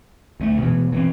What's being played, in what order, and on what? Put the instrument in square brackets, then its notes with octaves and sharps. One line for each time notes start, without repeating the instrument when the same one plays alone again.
[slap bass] D2 G#3 A3
B2 E3
E3 B3 C4